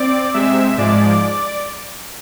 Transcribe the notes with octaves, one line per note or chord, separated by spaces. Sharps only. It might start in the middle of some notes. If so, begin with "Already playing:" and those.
Already playing: C4 D5 D6
C3 G#3 C4 E5 E6
G#2 F3 G#3 D5 D6